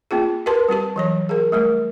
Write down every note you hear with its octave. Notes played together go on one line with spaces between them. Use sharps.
A#3 C4 F4 G#4
G4 A#4 B4 A5 C6
G3 C4 G4 A5
E3 F#3 C#5
G#4 A#4
G3 A3 A#4